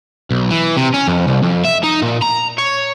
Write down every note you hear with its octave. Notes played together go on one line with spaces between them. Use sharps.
B1
E3
C3
C#4
F2
C2
F2
E5
D#4
A#2
A#5
C#5